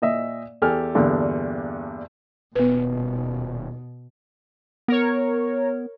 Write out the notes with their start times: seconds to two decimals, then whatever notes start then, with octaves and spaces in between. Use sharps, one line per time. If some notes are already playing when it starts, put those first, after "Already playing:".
0.02 A#2 D#5 E5
0.62 E2 G4 A4 G#5 F6
0.95 E2 G2 A#2 D3
2.56 D#1 B2 B3 B4
4.88 B3 A#4 C#5